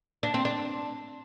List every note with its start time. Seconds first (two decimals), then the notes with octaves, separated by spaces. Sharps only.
0.23 D4
0.34 C4
0.45 D4